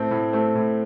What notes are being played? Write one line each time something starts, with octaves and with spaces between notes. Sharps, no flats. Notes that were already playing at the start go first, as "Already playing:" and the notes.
Already playing: A2 A3 C4
A2
A3 C4
A2